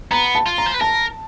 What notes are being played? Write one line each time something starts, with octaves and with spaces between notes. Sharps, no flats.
B3 A#5
A5
F4
A#5
C5
B4
A#4 A5